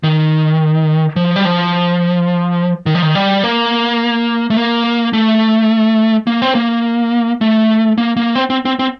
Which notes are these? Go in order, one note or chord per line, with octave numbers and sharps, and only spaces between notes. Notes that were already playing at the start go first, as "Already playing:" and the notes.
D#3
F3
G3
F3
D#3
F3
D#3
G3
A#3
A3
A#3
A3
A#3
C4
A#3
A3
A#3
A#3
C4
C4
C4
C4